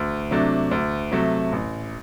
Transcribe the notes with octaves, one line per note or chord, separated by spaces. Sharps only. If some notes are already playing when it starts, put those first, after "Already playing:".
Already playing: D2
C3 F#3 A3 D4
D2
C3 F#3 A3
A1